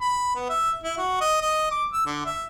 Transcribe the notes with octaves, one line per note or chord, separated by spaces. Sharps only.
B5
B3
E5
E4
F#4
D#5
D#5
D6
E6
D3
E5